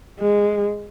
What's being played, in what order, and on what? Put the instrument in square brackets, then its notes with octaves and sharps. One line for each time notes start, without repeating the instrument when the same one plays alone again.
[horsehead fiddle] G#3